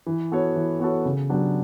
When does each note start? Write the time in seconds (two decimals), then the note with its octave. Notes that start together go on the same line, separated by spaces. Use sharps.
0.06 E3
0.32 B3 F#4 A4 C#5
0.56 E3
0.80 B3 F#4 A4 C#5
1.05 C#3
1.29 F#3 B3 D4 G4